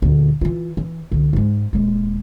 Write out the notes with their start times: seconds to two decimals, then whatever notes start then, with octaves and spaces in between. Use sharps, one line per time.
0.02 D2 A#2
0.41 E3 F4
0.77 E3
1.12 C2 D3
1.33 G#2 G#3
1.73 D#1 G#3